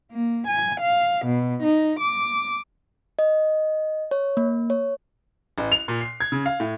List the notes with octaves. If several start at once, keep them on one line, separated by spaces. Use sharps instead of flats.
A#3
G#5
F5
B2
D#4
D6
D#5
C#5
A#3
C#5
A1
F7
A#2
C7
G#6
C#3
F5
A2